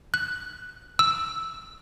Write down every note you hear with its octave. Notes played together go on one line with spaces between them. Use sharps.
F#6
E6